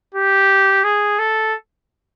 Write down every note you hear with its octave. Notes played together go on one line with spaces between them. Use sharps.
G4
G#4
A4